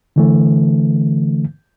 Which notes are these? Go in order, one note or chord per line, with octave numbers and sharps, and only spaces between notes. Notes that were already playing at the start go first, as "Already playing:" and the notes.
D3 E3 A3